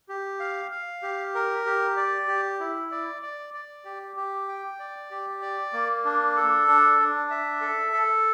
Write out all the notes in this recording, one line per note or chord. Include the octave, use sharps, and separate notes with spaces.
G4
F5
F5
G4
A#4
G4
D5
G4
E4
D5
D5
D5
G4
G4
G5
D5
G4
D5
A#3
D4
A4
D4
D4
E5
A4
A4